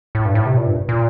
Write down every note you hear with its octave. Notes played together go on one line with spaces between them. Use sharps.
A2
G2
A2
C3
A#2
G2
A#2